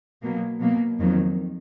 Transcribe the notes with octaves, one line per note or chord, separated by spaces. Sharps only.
B2 F#3 A#3
B2 F#3 A#3
F2 D#3 F#3